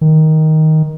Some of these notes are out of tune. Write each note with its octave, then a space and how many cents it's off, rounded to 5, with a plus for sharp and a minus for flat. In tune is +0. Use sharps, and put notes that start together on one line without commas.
D#3 +10